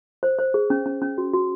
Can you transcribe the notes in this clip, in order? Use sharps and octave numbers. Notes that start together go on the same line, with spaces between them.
C5
C5
G#4
C#4
C#4
C#4
F#4
F#4